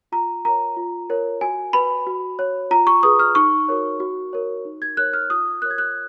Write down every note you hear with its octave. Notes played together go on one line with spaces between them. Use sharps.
F4 A#5
A#4 C#5 A#5
F4
A#4 C#5
F#4 G#5
B4 B5
F#4
C#5
F4 A#5
C#6
G#4 B4 D#6
F6
D#4 C#6
F#4 A#4 C#5
F#4
A#4 C#5
D#4
G#6
A#4 C#5 F#6
F6
F4 D#6
A#4 C#5 F#6
G#6
F#6